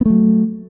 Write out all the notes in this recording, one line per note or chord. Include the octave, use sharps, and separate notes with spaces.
F#3 A3 B3